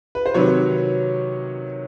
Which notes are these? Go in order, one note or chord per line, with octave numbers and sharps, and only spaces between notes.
B4
C5
C3 D#3 F#3 B4 C#5